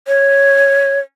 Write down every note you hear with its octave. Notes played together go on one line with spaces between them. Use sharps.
C#5